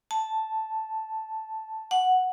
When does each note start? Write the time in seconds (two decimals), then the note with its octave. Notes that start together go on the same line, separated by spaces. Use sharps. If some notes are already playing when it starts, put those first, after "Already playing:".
0.11 A5
1.91 F#5